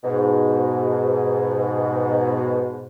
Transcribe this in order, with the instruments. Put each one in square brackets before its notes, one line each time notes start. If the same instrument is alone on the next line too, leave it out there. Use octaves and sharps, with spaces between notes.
[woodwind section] G#2 B2